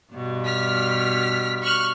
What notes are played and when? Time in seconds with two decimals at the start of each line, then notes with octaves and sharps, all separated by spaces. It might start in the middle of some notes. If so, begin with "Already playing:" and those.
0.14 G2 B2
0.44 F6 B6
1.62 C#6 F6 F#6